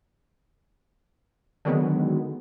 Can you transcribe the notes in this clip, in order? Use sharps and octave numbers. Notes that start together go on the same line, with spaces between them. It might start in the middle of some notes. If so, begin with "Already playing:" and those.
D3 D#3 F#3 G#3 B3